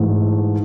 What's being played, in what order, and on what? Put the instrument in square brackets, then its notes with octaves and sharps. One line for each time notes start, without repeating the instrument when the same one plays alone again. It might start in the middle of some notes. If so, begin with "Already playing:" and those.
Already playing: [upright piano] G#2 E3 A3